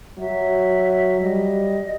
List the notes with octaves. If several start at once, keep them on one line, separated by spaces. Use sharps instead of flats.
F#3 E5
G3 D#5